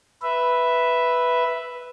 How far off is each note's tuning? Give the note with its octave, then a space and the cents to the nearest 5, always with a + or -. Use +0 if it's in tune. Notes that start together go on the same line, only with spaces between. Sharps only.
B4 +0 E5 +0